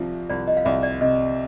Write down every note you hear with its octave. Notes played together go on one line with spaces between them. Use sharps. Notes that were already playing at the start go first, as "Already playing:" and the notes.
Already playing: C2 C3 F3
C2 D5
D#5
F5
C2 E5
D5
C3 D#5